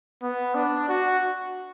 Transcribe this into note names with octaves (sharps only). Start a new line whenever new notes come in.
B3
D4
F#4